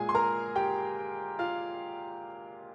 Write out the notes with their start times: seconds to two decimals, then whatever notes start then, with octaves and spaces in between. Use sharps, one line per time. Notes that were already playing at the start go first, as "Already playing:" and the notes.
Already playing: A#2 G#3 G#4 G#5
0.09 C6
0.15 A#4 A#5
0.55 G4 G5
1.39 F4 F5